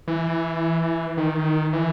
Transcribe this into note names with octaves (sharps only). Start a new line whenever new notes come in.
E3
D#3
E3